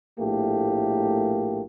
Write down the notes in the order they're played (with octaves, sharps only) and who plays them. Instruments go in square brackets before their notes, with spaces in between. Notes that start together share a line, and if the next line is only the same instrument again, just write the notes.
[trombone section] A#1 A2 A3 A#3 G4